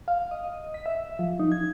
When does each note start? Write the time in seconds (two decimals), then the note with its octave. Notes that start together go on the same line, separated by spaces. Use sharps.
0.08 F5
0.31 D#5
0.74 B6
0.86 E5
1.19 F3
1.40 D#4
1.52 G#6